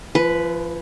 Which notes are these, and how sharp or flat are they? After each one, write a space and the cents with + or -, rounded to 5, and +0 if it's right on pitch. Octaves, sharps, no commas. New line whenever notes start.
F3 -35 B4 +0